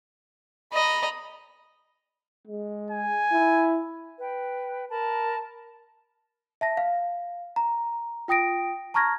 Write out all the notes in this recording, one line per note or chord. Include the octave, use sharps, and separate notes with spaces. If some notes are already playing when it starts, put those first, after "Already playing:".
D#5 A#5 B5
G#3
G#5
E4
B4 G5
A#4 A5 B5
E5 A5 A#6
F5
A#5
F4 G5 D#6 A#6 D7
A5 A#5 C#6 F6 G#6 A#6